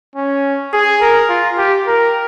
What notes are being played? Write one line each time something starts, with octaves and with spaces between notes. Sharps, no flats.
C#4
G#4
A#4
F4
G4
A#4